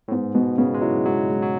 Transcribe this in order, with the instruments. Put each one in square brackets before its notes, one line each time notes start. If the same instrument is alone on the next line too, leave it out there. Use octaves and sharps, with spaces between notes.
[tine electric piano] A2
[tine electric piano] G#2 [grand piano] B3
[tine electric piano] B2 [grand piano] B3
[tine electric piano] C#3 [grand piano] B3
[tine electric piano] G#3
[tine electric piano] F#3 [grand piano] E4
[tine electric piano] F#3 [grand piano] G#3
[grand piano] G#3
[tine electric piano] F#3